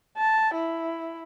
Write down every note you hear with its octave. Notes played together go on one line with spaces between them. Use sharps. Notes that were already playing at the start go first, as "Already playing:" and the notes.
A5
E4